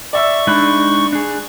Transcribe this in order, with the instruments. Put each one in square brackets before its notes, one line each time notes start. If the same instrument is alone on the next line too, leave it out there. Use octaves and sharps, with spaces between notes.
[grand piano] D5 E5 E6 [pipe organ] C#6
[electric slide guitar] G#3 D#4 [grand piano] D4 B5 F#6
[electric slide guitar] D4 G#4